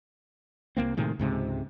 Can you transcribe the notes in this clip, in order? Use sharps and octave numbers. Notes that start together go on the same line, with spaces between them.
C2 A#2 A#3 C4
A2 C3 D#3 G#3
C#2 G#2 C3